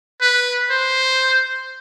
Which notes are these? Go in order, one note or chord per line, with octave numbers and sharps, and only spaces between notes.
B4
C5